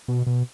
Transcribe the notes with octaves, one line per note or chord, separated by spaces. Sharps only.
B2
B2